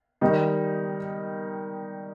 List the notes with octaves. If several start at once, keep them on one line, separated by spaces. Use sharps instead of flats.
D#3 G3 D#4